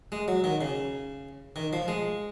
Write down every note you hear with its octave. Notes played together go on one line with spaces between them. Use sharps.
G#3
F#3
D#3
C#3
D#3
F3
G#3